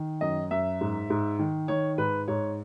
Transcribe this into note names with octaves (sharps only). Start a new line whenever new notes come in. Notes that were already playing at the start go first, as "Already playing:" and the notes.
Already playing: D#3
F#2 D#5
F#2 E5
G#2
G#2
D#3
D#3 C#5
G#2 B4
G#2 C#5